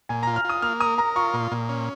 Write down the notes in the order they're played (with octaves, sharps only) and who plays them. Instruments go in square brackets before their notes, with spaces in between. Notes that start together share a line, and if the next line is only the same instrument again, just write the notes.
[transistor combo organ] A#2 [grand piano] G#5
[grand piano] A#5
[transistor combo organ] F4
[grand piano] F6
[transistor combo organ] F4 [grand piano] D#6
[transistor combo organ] A#3 [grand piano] F6
[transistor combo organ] A#4 [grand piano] D#6
[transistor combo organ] A#4 [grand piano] A#5
[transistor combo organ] F4 [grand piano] C#6
[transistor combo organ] A#2
A#2
C#4